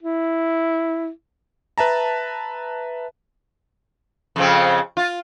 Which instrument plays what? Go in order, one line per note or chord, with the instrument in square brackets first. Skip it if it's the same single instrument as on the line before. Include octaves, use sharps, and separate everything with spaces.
[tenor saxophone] E4
[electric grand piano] B4 E5 A5 A#5
[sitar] F2 C#3 C4
F4